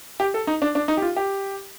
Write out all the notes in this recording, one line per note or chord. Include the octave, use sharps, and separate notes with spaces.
G4
A4
D#4
D4
D4
D#4
G4
F4
G4